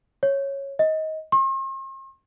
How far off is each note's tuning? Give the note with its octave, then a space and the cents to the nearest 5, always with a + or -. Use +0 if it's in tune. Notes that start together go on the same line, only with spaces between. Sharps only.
C#5 -10
D#5 +20
C6 +45